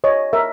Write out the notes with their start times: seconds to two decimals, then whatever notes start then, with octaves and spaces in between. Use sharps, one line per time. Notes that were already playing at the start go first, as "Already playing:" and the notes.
0.04 C#5 D#5
0.33 A#4 E5